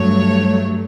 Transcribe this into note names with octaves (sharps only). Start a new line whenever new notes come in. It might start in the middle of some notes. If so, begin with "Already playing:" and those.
Already playing: G2 F#3 A3 C#5